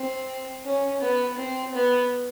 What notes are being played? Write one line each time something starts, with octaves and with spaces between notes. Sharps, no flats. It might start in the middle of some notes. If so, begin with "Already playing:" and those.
Already playing: C4
C#4
B3
C4
B3